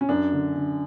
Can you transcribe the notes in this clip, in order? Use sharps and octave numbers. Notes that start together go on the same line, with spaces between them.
C#4
F#2 D4
D3
D3